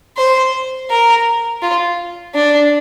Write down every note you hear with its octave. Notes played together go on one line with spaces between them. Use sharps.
C5
A#4
F4
D4